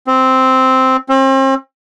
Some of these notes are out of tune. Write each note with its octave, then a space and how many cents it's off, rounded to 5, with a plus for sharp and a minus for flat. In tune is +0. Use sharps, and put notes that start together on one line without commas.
C4 -5
C4 +40